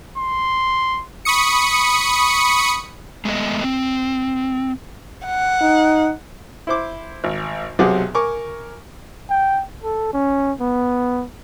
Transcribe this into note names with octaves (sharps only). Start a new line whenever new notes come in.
C6
B5 C#6 D#6 C#7
G#3 A3 B3 B4 D#5
C4
F#5
D#4
E4 C5 D6
G#1
B1 C3 F#3 G#4 F#5 D6
A#4 G#5 C#6 D6
G5
A4
C#4
B3